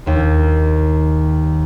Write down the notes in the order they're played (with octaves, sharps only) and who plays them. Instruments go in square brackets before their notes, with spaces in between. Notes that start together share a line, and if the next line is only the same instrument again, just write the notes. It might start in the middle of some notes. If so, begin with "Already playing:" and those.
[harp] D#2 D#3